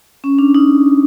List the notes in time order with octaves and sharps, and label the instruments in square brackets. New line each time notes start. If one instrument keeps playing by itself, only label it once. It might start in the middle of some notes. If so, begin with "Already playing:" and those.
[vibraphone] C#4
D4
D#4